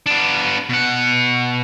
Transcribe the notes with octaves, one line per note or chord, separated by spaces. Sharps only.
B3 D4
B2 F#5